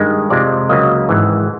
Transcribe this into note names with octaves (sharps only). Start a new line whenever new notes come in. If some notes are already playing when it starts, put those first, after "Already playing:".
Already playing: G2 D#3 G#3 D#5
F2 C3 F3 G#3 D5
C#2 C#3 F#3 A#3 D#5
G#1 G#2 E3